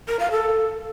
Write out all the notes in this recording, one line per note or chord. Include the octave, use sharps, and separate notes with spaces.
A#4
F5
A4